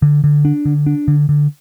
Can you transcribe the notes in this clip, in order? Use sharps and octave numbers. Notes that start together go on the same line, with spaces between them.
D3
D3
D4
D3
D4
D3
D3